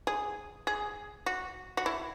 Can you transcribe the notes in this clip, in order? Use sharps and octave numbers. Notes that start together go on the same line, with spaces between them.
G#4
G#4
F#4
F#4
E4